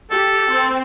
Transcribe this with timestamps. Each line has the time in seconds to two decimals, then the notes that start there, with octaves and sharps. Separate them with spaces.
0.11 G4 A4
0.51 C4